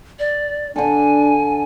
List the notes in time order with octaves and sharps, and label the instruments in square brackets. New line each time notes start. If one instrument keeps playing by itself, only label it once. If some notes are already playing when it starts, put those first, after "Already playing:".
[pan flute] D5
[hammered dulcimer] D3 A4 [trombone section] D4 [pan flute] G#5